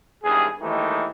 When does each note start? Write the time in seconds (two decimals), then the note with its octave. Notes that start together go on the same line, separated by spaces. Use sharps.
0.24 G#1 E2 G2 G#4
0.60 D#2 D#3 E3 G#3 A3 D#4